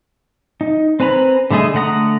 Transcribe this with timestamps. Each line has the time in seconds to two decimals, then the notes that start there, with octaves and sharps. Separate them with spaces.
0.61 D#4
1.00 C4 B4 G#5 A#5 B5
1.51 D3 G3 A3 G#4 D#5
1.74 D3 A3 F#5 A#5 D#6